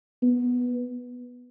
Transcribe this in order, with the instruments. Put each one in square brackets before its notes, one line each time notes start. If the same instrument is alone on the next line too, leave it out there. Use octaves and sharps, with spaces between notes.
[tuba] B3